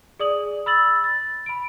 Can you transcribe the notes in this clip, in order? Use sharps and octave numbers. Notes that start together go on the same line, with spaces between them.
G#4 D5 D#6 F#7
B5 E6 A6 F#7
A6
B5 D7